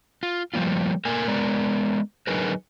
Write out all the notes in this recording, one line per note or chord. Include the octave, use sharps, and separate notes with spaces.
F4
F3 G3 A#3 F4
A3 A#3 A#4 G#5
G#3 B3 A#4 D5
D3 F#3 D#4 G#4 A#4 B4